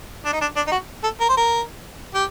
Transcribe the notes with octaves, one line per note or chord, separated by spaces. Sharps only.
D4
D#4
D4
D4
D#4
F#4
A4
A#4
C5
A#4
G4